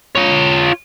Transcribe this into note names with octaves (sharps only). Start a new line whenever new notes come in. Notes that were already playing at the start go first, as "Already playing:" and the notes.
F4 C#5